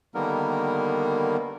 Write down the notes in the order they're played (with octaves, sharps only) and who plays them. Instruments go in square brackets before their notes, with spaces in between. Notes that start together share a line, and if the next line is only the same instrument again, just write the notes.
[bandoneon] D3 D#3 G3 A#3 B3 A#4